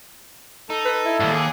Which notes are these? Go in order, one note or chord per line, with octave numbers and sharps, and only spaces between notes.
D#4 A4
B4
E4
D#2 G#2 G3
G#4